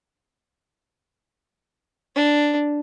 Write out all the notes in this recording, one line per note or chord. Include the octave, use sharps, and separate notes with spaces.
D4